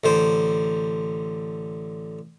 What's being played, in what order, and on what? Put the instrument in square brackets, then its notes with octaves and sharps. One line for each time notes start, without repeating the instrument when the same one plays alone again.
[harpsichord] A1 D3 C5